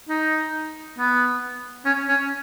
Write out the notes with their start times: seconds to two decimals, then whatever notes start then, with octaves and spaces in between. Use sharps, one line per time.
0.09 D#4
0.98 B3
1.86 C#4
2.09 C#4